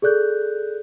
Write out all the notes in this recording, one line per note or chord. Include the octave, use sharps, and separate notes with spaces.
G#4 A4 D5 F#6 G6